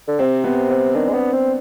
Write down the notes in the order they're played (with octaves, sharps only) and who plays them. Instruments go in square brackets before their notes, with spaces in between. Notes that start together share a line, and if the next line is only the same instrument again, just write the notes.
[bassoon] D3
[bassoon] C3 [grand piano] C4
[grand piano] B3
C4
[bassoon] D#3 [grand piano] D4
[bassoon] G#3
[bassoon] B3 [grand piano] C4
[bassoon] C4 [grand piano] D4